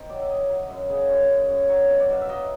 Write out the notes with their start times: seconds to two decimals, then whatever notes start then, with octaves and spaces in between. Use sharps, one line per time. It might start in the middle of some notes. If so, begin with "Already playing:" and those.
Already playing: D#3 C5
0.09 F#3 D5
0.21 E5
0.30 F#3 D#5
0.49 F#3
0.69 F#2 E5
0.89 C#3 D#5
1.09 F#2 C#5
1.29 F#2
1.50 F#2
1.69 F#3 C#5
1.90 B2
2.00 D5
2.10 B2 F5
2.21 E5
2.29 F#3 D#5